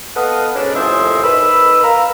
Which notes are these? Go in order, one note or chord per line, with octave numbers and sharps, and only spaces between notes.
B3 A4 B4 D#5 F5 F#5
G#2 B2 C#4 D4
C2 F2 A2 G#3 C5 E5
D#3 A#4 B4 B5 E6
A#4 F5 A#5 E6